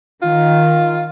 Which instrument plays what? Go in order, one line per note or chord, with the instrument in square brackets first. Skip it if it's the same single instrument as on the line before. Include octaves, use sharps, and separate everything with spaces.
[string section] D#3 [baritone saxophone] F4